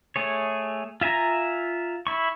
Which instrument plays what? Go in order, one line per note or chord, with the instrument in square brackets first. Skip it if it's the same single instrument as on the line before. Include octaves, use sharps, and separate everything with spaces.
[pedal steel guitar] A3 G#4 C#5
F4 E5 G#5 A#5
E4 C#6